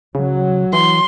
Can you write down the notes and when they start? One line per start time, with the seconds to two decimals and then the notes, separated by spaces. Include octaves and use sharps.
0.15 C#3 F#3
0.73 E3 C6